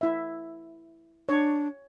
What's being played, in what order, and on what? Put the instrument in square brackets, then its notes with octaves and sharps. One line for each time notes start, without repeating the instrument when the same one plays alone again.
[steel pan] E4 E5
[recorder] D4 [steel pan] C#5